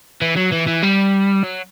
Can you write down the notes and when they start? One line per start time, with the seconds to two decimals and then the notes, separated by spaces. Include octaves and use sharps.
0.22 E3
0.37 F#3
0.52 E3
0.68 E3
0.83 G3
1.44 F#3